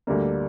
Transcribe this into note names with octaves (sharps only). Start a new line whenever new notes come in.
D2 D3 G3 A#3